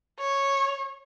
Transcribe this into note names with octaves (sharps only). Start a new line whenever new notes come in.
C#5